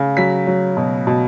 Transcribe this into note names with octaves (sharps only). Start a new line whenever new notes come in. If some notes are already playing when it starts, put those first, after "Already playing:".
Already playing: C#3
F#3 B6
F#3
B2
B2